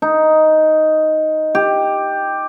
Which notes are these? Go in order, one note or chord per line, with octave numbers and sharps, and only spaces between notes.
D#4
G4